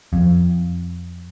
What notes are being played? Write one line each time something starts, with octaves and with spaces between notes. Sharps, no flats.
F2